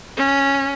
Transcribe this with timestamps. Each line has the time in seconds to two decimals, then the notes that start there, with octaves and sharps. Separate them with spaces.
0.17 C#4